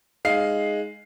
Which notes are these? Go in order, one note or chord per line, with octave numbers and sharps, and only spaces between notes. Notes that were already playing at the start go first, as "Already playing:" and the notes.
G#3 D#4 F5 C7